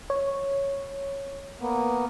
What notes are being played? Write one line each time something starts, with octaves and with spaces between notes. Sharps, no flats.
C#5
A#3 B3